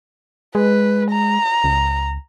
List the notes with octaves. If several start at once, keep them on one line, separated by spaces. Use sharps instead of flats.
G#3 B4
A#5
C#2